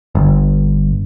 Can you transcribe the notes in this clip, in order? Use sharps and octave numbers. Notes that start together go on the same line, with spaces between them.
G1